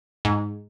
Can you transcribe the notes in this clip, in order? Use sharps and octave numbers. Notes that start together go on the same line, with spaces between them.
G#2